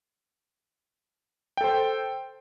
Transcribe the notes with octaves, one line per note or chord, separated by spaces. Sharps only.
A4 C5 G5